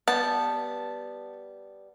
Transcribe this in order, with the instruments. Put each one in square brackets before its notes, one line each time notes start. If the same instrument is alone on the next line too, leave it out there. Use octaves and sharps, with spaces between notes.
[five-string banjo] G3 B3 [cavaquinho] A5